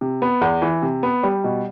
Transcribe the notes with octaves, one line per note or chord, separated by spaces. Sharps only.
C3
B3
E2
E3
C3
B3
G3
B2